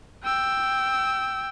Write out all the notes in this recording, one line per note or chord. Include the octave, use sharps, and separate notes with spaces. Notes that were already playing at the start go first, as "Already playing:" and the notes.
G5 E6